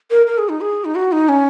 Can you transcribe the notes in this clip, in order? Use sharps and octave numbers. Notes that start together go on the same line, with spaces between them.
A#4
A#4
G#4
D#4
G#4
D#4
F#4
D#4
C#4